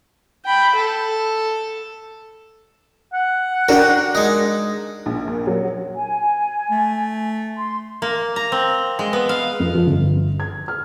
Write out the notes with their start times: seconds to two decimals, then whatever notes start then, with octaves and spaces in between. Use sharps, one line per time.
0.45 G5 B5
0.76 A4
3.14 F#5
3.69 D4 F#4 A#4 G5
4.15 G#3 D#4
5.06 A#1
5.28 A#2
5.47 F#3
5.93 G#5
6.70 A3
7.56 C6
8.02 A#3
8.36 A#5
8.52 C4
8.99 G#3
9.13 B3
9.29 F5
9.60 F2
9.75 F3
9.87 G1
10.40 G#6
10.68 F6